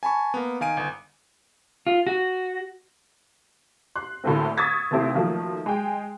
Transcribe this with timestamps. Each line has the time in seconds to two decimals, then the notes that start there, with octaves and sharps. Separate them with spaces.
0.03 G#5 A5 B5 C#6
0.34 A#3 B3
0.61 D#3 F5 G#5 D7 D#7
0.77 G1 G#5
1.87 F4
2.07 F#4
3.96 C6 F#6
4.24 D2 A2 D3 A3 A#3 C4
4.57 C#6 D#6 E6 G#6 A6 B6
4.91 D#2 C3 A3 C4 E4 C6
5.15 D#3 F3 F#3 A3 A#3
5.66 G#3 G5